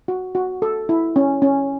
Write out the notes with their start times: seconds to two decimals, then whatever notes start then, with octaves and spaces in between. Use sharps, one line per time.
0.08 F#4
0.35 F#4
0.62 A4
0.89 E4
1.16 C#4
1.42 C#4